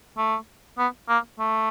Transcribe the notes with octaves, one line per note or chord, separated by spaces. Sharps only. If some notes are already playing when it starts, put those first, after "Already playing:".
A3
B3
A#3
A3